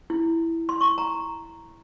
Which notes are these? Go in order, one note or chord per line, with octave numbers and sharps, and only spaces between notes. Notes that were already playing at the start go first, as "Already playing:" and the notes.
E4
C6
C#6
A#5